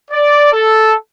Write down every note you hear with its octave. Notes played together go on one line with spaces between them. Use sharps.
D5
A4